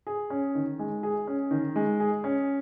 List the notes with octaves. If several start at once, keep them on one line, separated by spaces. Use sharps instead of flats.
G#4
C#4
D#3
G#3
G#4
C#4
D#3
G#3
G#4
C#4